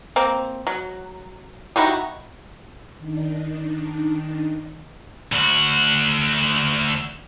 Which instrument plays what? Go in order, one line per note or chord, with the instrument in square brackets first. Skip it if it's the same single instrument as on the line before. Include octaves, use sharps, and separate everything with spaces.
[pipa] A#3 C4
F#3
D#4 E4 F#4 G4
[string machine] D#3 D4 D#4
[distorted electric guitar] D2 F#4